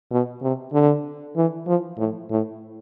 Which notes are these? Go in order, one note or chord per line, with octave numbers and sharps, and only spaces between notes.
B2
C3
D3
E3
F3
A2
A2